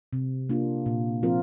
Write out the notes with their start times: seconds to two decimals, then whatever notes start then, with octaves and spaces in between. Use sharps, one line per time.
0.13 C3
0.49 A#3 D4 F4
0.86 A#2
1.23 F3 C4 F4 A#4